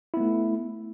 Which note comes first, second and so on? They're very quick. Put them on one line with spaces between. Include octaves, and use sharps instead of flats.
E4 B3 A3